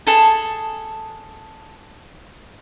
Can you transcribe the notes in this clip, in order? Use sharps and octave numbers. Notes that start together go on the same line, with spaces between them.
G#4 A4 A5